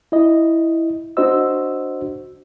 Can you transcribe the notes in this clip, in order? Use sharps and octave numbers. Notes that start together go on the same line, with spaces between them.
E4 D#5
D4 F#4 C5 D#5 E6